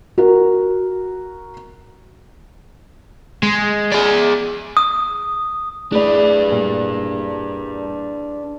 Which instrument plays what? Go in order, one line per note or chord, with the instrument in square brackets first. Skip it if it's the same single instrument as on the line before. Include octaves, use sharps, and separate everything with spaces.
[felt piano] F#4 A#4
[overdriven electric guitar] G#3
G#4 D5
[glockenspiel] D#6
[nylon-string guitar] A3 D5 [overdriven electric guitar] D4 B4 [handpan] E4 G#4
[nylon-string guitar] A#2 G3